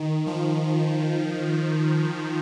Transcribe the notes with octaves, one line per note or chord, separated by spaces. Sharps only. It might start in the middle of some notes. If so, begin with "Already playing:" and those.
Already playing: D#3
F3